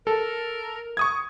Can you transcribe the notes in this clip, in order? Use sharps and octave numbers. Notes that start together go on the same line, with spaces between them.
A4 A#4
C#6 D#6 G#6